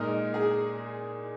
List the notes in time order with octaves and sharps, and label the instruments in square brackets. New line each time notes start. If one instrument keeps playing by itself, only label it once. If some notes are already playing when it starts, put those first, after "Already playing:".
Already playing: [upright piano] A#2 G#3 D#4 [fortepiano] A#4
[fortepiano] G#4